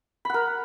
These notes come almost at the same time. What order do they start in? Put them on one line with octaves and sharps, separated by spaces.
B5 F#5 A#4